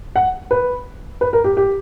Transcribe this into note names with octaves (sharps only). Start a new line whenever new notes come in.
F#5
B4
B4
A#4
G4
G4